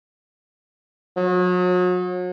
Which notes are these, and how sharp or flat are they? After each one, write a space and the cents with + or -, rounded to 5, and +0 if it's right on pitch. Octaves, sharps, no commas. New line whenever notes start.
F#3 -40